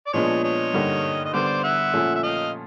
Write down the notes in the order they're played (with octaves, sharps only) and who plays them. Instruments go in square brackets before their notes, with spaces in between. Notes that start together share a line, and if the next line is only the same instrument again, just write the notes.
[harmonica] D5
[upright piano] A#2 F3 G#3 B3 D4 [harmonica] C#5 D#5
[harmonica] C#5 D#5
[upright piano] G2 D3 G3 A#3 D#4
[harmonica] D#5
[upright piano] D3 G3 B3 [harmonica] C5 D5
[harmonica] E5 F#5
[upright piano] A#2 F3 A3 C#4
[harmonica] E5
D#5 F5